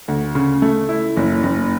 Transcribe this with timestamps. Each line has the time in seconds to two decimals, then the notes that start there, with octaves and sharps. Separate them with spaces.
0.08 D2
0.35 C#3
0.62 A3
0.89 E4
1.17 F#1
1.43 F#1